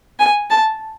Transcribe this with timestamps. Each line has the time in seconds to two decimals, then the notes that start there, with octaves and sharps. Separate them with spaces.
0.19 G#5
0.50 A5